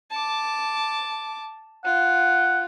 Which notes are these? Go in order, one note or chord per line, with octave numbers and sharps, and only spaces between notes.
A5 D6
F4 F#5